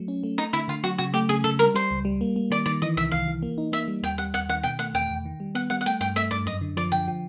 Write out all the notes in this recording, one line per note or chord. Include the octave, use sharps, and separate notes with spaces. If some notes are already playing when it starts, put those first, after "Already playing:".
Already playing: F#3 A3
C#4
A3
A3 D#4
D3 E4
D3 F4
F#3 F#4
C#3 F#4
A3 G4
C#3 G#4
C#3 A4
G3 A#4
G3 C5
C#2
G3
A#3
A#3
D#3 D5
D#3 D5
E3 D#5
C2 E5
C2 F5
E3
A#3
D#4
A#3 E5
G3
D#2 G5
G3 F#5
D#2 F#5
D#3 F#5
B2 G5
A3 F#5
E2 G5
E2
D#3
G3
B3 F#5
G3 F#5
F#5
A3 G5
G2 G5
A3 E5
G2 D5
F#2 D#5
D3
F3 D5
D3 G5
F3